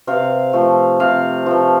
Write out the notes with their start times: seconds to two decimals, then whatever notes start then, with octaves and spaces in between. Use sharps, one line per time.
0.07 C3 F5
0.53 F3 A3
1.00 C3 F5
1.46 F3 A3